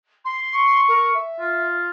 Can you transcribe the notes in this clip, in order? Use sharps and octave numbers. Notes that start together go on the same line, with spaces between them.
C6
C#6
A#4
E5
F4